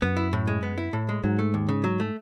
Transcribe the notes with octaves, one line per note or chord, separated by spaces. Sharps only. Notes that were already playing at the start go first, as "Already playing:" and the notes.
F#2 B3
E4
A2
G#3
B3
E4
A2
G#3
G#2 F#3
A3
D#2
C#3
F#3
A3